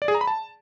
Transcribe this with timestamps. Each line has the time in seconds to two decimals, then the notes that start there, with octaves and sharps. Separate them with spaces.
0.02 D5
0.08 G#4
0.15 A#5
0.21 B5
0.27 A5